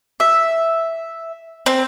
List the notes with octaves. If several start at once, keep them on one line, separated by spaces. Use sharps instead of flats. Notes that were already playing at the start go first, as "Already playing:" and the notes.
E5
C4